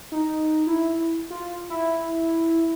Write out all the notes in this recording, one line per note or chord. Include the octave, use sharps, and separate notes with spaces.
D#4
E4
F4
E4